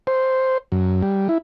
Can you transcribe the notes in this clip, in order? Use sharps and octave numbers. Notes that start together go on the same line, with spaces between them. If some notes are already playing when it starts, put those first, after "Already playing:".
C5
F#2
G3
E4